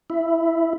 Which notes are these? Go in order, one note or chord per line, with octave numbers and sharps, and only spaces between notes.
E4